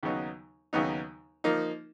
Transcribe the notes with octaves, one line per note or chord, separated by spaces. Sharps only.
D#2 C#3 F#3 B3 D#4
D#2 C#3 F#3 B3 D#4
F3 A#3 D#4